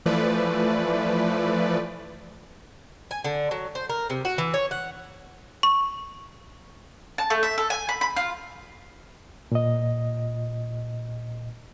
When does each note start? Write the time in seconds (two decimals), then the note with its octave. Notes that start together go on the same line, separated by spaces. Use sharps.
0.06 E3 F3 A3 B4 D5
3.11 G#5
3.25 D3
3.51 F#3
3.75 C5
3.89 A#4
4.10 C3
4.25 F#4
4.38 E3
4.54 C#5
4.71 F#5
5.63 C#6
7.18 A5
7.30 A3
7.43 E5
7.58 A4
7.70 G#5
7.89 B5
8.01 B5
8.16 F4
9.52 A#2 D#5